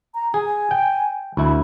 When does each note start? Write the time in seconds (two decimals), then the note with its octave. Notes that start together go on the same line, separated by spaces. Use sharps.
0.15 A#5
0.34 G#4 G#5
0.71 G5
1.37 D2 E4 B5